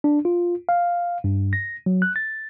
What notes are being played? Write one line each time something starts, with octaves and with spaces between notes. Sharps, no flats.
D4
F4
F5
G2
A#6
F#3
F#6
A6